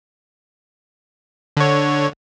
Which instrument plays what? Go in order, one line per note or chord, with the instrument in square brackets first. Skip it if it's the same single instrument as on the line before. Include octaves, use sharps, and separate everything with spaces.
[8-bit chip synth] D3 C#5